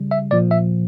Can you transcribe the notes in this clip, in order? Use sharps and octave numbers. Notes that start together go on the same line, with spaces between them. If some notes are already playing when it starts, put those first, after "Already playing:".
Already playing: C#3 G3
E5
A#2 F3 D5
E5